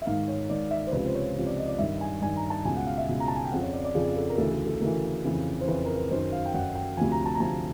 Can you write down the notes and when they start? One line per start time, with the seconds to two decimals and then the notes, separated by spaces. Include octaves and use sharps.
0.02 E5
0.06 G#2 D#3 F5
0.28 C#5
0.49 G#2 D#3 D5
0.71 E5
0.87 C5
0.92 C#2 C3 F3 B4
1.07 C5
1.14 C#5
1.36 C#2 C3 F3
1.46 D5
1.58 D#5
1.68 D5
1.79 G2 D#3 E5
2.01 G#5
2.21 G2 D#3 G#5
2.37 A#5
2.50 A5
2.65 C#2 B2 G#5
2.76 F#5
2.87 F5
2.98 E5
3.09 C#2 B2
3.20 A#5
3.28 A5
3.36 G#5
3.44 G5
3.51 F2 C#3 F3 F#5
3.62 C#5
3.73 D5
3.84 D5
3.95 F2 C#3 F3 G#4
4.16 A4
4.29 A#4
4.38 D2 C#3 E3 A4
4.52 A4
4.67 A4
4.81 D2 C#3 E3 A#4
5.24 F2 C#3 E3
5.61 C5
5.68 F2 C#3 E3 B4
5.85 A#4
5.98 B4
6.11 F#2 D#3 C5
6.32 F5
6.46 G5
6.54 F#2 D#3 F#5
6.75 G5
6.97 D2 C3 F3 G#5
7.12 A#5
7.26 A5
7.34 A#5
7.40 D2 C3 F3 A5